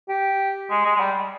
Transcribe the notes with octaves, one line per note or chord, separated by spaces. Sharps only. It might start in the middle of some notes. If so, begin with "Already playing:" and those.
G4
G#3
G#3
G#3
G3